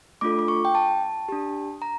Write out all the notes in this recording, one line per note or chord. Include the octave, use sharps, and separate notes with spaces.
A3 D4 F4 A4 D6
D6
C#6
G5
A5
D4 G4
A#5